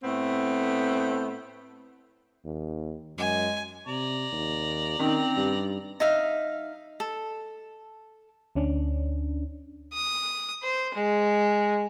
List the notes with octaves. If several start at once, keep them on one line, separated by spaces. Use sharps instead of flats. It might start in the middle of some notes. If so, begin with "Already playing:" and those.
A2 A3 B3 C4
D#2
F#2 G#3 G#5
C3 D5 A#5
D#2
D#3 C4 C#4 D#4
G2 G4
D#4 E5 F5
A4
D2 C#4 D4
D#6
C5
G#3